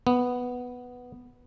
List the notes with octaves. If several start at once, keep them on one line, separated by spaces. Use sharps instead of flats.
B3